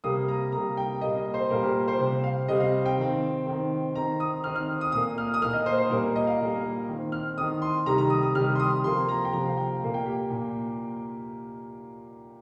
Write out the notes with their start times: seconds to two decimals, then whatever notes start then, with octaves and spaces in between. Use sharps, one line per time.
0.04 C3 G3 A#3 D#6
0.28 A#5
0.52 C3 G3 A#3 A#5
0.77 G5
1.01 A#2 G3 A#3 D#5
1.18 D#5
1.34 C5
1.50 A#2 G3 A#3 A#4
1.63 G4
1.88 C5
1.99 C3 G3 C4
2.24 F5
2.48 C3 G3 C4 D#5
2.60 F5
2.86 G5
2.97 D#3 C4
3.46 D#3 C4
3.95 D#3 C4 A#5
4.20 D#6
4.44 D#3 C4 F6
4.56 F6
4.81 D#6
4.92 A#2 A#3 D#6
5.18 F6
5.34 D#6
5.41 A#2 A#3 F6
5.53 D#5
5.66 C5
5.78 C5
5.90 A#2 G3 A#3 A#4
6.03 A#4
6.15 D#5
6.27 F5
6.39 A#2 G3 A#3
6.89 D#3 C4
7.12 F6
7.38 D#3 C4 D#6
7.62 C6
7.86 C3 D#3 G3 A#5
7.98 A#5
8.10 D#6
8.23 D#6
8.35 C3 D#3 G3 F6
8.55 C6
8.60 D#6
8.84 C3 F3 A#3 C6
9.09 A#5
9.25 G5
9.32 C3 F3 A#3 A#5
9.45 F5
9.57 G5
9.82 A#2 A#3
9.94 G5
10.06 G4
10.30 A#2